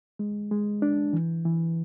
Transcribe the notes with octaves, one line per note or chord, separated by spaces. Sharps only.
G#3
G#3
D4
E3
E3